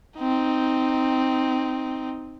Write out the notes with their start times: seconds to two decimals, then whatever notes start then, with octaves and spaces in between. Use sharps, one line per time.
0.18 C4 D#4